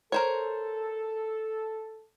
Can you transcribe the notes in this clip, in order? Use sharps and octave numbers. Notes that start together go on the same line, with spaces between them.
A4 A#4 C5 C#5